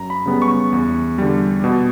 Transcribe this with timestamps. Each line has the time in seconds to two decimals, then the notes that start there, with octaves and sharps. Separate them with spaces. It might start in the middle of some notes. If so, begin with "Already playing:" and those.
Already playing: F#2 A#5
0.10 B5
0.26 C#3 G3 B3
0.42 C#6
0.73 E2
1.18 D3 G3
1.64 B2